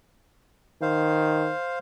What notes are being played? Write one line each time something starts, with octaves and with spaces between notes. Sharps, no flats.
D#3 C5 F5